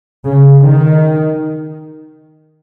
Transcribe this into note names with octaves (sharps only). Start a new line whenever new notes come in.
C#3
D#3